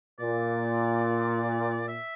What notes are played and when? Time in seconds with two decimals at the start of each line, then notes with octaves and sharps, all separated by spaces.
0.19 A#2 D5
1.88 E5